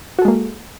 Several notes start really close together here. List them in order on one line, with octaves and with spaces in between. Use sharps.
F#4 A4 G#3 A#3